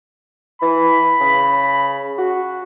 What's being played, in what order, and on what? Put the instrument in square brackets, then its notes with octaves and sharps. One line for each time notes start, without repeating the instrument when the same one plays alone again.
[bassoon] E3 [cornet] B5
[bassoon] C#3
F#4